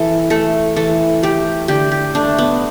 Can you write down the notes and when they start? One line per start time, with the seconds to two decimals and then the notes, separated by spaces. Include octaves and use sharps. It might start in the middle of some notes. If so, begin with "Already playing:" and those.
Already playing: E3 A4
0.30 A3 A4
0.76 E3 A4
1.23 A3 G4
1.68 D3 G4
1.92 G4
2.15 A3 D4
2.38 B3